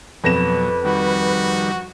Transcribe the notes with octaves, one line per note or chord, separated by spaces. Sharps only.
F2 B2 F#3 B4 A#6 E7
D#3 G3 F#4